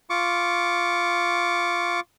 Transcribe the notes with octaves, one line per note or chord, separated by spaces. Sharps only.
F4 C#6 D6